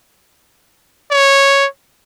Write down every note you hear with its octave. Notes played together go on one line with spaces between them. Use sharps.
C#5